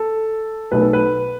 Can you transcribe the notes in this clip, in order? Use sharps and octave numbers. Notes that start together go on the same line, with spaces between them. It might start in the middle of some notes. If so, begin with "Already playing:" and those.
Already playing: A4
B1 B2 A3 B4
A4
B4